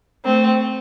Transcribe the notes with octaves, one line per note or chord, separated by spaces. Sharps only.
A3 C4